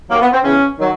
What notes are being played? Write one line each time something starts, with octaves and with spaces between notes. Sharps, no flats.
D#2 D#3 F#3 A#3
B3
C4
E2 C#3 E3 C#4
D#3 F#3